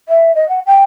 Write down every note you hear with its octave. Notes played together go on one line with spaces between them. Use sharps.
E5
D#5
F#5
G5